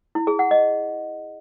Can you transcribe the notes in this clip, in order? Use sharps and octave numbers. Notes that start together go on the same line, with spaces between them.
E4
G#4
F#5
D#5